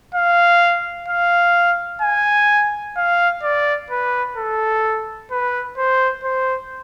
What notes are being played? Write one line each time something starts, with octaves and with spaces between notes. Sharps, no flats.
F5
F5
G#5
F5
D5
B4
A4
B4
C5
C5